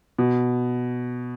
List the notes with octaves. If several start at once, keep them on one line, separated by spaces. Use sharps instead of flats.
B2